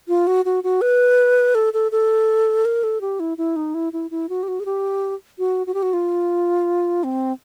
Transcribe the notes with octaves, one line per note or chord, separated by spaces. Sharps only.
F4
F#4
F#4
F#4
B4
A4
A4
A4
A#4
A4
G4
E4
E4
D#4
E4
E4
E4
F#4
G4
F#4
G#4
G4
F#4
F#4
G4
F#4
F4
C4